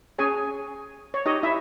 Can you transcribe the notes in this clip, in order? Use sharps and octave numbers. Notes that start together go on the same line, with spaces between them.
C#4 G#4 C#5 G#5
C#5
D#4 G4 C#5 D#5
E4 E5